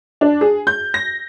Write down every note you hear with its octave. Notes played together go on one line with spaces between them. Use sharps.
D4
G#4
G6
A#6